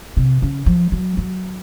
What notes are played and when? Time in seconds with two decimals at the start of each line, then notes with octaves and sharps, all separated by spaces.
0.17 C3
0.42 C#3
0.66 F3
0.92 F#3
1.17 F#3